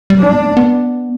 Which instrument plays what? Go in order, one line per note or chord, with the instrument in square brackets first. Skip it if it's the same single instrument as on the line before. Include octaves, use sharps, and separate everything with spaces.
[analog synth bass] G3
[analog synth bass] F#3 [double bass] D4
[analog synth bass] B3
A3
B3